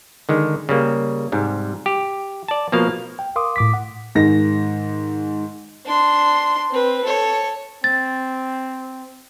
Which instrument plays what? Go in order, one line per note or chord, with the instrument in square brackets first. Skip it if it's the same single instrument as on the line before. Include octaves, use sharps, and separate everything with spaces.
[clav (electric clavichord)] D3 D#3 G#3
C#3 G3 A#3
G#2 C3 G3
G4
D5 A5
B2 F3 A#3 F5
[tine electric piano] G5
A#4 F5 C6 D6 D#6
A2 D6 B6
F#5
[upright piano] G#2 D#3 G#4 A#6
[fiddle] D4 C6
C4 B4
A4 C#5
[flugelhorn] C4 [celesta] A6